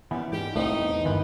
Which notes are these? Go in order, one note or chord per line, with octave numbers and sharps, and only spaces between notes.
A#2 E3 G3 B3 C#4
G#2 G4
C2 A2 A3 C4 D#4
E2
G1 D#3 E3 F4 G4 B4